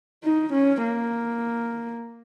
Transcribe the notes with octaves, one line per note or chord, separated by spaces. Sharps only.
D#4
C#4
A#3